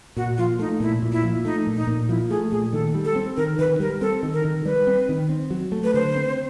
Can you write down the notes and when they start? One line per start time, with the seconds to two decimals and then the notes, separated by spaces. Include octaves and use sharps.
0.17 A#2 F#4
0.38 F3 F4
0.59 A3 D#4
0.80 A#2 E4
1.02 A#2
1.12 E4
1.24 F3
1.45 A3 D#4
1.67 A#2
1.76 D#4
1.87 A#2
2.08 F3 E4
2.30 A3 G#4
2.51 A#2 G#4
2.73 D#3 A4
2.95 G3
3.05 A4
3.16 C4
3.37 D#3 A#4
3.59 D#3 B4
3.80 G3 A#4
4.01 C4 A4
4.23 D#3
4.33 A#4
4.45 D#3
4.65 G3 B4
4.87 C4
5.09 D#3
5.29 C4
5.50 F#3
5.72 A3
5.84 B4
5.94 D3 C5
6.16 C4